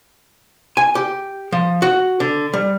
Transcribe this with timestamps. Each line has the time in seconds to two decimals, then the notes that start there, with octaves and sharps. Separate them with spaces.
0.77 G#5
0.95 G4
1.52 F3
1.82 F#4
2.20 D3
2.54 G3